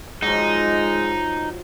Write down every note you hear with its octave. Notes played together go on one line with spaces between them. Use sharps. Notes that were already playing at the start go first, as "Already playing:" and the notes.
F3 F#3 G#3 D#4